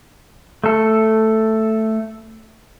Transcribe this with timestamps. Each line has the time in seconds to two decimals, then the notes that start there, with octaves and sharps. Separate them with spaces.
0.64 A3 A4